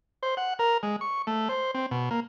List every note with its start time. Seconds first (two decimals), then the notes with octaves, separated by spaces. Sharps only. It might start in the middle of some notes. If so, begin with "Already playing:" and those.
0.23 C5
0.37 F#5
0.59 A#4
0.83 G#3
1.01 C#6
1.27 A3
1.49 C5
1.75 C4
1.91 B2
2.11 A#3